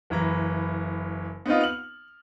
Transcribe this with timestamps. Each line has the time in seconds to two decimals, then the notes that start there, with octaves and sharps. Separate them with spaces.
0.10 F#1 E3 A#5
1.46 B3 C4 D#4 F4
1.61 F6 F#7